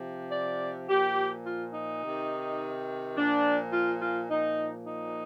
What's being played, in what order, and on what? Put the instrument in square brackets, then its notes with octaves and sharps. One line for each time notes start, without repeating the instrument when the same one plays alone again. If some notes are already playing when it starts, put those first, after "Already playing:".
Already playing: [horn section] C3 F3
D5
A#2 F3 G4
F4
D#4
C3 D#3
A#2 F3 D4
F4
F4
A#2 F3 D#4
D#4